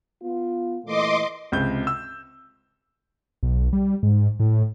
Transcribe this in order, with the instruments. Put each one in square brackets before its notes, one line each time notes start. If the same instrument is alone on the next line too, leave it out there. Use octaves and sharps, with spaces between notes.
[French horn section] B3 F4
[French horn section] A#2 E3 A3 [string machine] D#5 C6 D6
[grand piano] C#2 C3 G6
E6
[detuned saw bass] B1
G3
G#2
A2